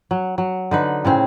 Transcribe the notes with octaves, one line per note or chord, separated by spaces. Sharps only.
F#3
F#3
D3 D#4 B4
A2 C#3 C4 G#4